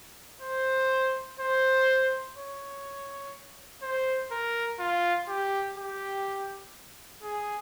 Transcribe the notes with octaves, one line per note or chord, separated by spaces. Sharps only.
C5
C5
C#5
C5
A#4
F4
G4
G4
G#4